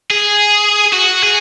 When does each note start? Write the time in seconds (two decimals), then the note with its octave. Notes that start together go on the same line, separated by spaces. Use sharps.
0.11 G#4
0.93 F#4
1.23 G#4